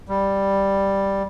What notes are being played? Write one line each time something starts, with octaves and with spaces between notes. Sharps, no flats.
G3